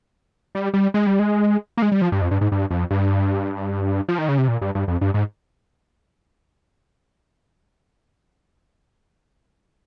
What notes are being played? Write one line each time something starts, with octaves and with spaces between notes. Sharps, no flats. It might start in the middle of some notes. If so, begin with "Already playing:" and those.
G3
G3
G#3
G3
G#3
A#3
G#3
G3
F3
G2
F2
G2
G#2
G2
F2
G2
F3
D#3
C#3
C3
A#2
G2
G2
F2
G2
G#2